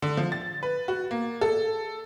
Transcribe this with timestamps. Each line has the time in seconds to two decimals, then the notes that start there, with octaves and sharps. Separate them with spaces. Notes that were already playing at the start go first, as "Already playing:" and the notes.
0.02 D3
0.17 F3
0.32 A6
0.63 B4
0.88 F#4
1.11 A#3
1.41 A4